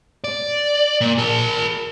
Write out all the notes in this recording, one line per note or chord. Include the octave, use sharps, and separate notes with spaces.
D5
A#2
A#4 A5